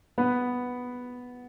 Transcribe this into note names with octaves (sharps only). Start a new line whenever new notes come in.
B3 B4